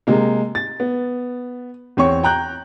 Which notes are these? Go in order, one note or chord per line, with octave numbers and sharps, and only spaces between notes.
C3 G#3 A#3
A6
B3
E2 C4 C#5 C#6
G5 A#5 F#6 G6